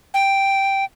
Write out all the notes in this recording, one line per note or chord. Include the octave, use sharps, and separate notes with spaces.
G5